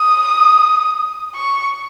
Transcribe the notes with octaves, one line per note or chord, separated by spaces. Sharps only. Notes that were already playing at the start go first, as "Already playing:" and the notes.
Already playing: D#6
C#6